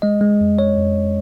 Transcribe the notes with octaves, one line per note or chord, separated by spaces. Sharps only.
G#3 D#5
G#3
F2
G#3 C#5
F2